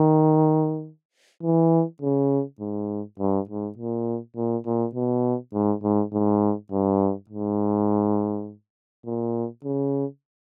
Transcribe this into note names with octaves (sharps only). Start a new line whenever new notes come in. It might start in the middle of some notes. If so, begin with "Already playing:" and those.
Already playing: D#3
E3
C#3
G#2
G2
G#2
A#2
A#2
A#2
B2
G#2
G#2
G#2
G2
G#2
A#2
C#3